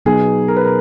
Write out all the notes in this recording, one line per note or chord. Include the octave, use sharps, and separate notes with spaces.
B2 F#3 B3 D#4 G#4
A#4
B4
A#4